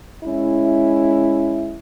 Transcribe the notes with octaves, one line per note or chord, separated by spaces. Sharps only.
G#3 C#4 E4